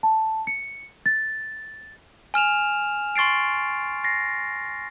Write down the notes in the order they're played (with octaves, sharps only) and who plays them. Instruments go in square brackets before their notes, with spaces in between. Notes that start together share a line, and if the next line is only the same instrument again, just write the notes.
[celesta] A5
C#7
A6
[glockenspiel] G#5 F6 E7 F7
C6 C#6 A6 C7 D7
A6 A#6 C7